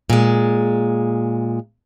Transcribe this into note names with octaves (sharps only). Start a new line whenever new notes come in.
A#2 G#3